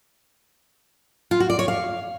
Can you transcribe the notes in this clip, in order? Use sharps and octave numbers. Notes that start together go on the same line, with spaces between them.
F4
F#4
D5
C#5
F5